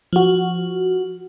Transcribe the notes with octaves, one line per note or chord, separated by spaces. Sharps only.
F3 F#4